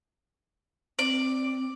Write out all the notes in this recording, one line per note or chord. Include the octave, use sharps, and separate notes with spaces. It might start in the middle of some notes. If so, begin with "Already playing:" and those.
C4 D5